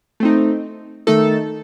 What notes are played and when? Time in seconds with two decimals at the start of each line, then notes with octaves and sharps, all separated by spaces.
0.20 A3 C4 D#4
1.07 D#3 A3 D#4 A4